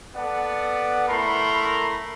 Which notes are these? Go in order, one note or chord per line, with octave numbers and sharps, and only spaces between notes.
B3 A4 D5 F#5
A3 E4 A#4 B5 C6